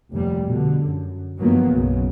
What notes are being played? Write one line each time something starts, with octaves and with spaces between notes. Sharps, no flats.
F1 D#2 G3
B2 D3
F#2
G2 D#3 F3 F#3 A#3 B3
B1 F#2 C#3 F#3